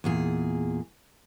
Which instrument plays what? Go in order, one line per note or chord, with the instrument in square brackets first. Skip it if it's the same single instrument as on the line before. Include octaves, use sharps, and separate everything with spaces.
[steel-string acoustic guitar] E2 A#2 G#4